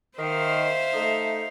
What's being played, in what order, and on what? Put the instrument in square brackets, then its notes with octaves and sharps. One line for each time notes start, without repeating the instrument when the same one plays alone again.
[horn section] D#3 [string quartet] C5 E5 F5
[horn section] A3 D#4